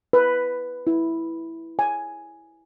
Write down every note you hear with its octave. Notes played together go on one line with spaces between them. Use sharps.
B4
E4
G#5